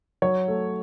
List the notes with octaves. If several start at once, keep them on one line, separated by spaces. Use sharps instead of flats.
F#3 C#5
A3